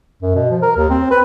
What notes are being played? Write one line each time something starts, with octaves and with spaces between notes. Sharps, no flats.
F#2
B2
F3
A#4
D#2
C4
B4